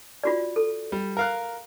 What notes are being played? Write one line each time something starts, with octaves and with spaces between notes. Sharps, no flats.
F4 F#4 D5
A4
G3
A#4 F5 F#6